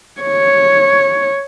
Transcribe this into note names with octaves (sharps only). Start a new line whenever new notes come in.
C#5